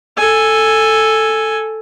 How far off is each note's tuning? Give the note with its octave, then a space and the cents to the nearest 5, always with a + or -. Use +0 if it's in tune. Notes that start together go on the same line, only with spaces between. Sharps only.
A4 +0 G#5 +0